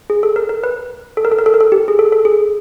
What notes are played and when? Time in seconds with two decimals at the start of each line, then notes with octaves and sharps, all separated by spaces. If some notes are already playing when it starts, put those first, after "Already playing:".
0.10 G#4
0.23 A4
0.36 A#4
0.49 A#4
0.64 B4
1.17 A4
1.25 A#4
1.32 A4
1.38 A#4
1.46 A4
1.54 A#4
1.61 A4
1.72 G4
1.88 G#4
1.99 A4
2.12 A4
2.25 G#4